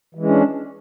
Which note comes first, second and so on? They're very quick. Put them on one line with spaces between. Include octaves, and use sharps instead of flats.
E3 G#3 C#4 D4